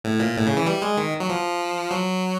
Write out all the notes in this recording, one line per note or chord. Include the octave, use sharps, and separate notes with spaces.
A2
A#2
A2
C#3
E3
G3
G#3
D#3
F#3
F3
F#3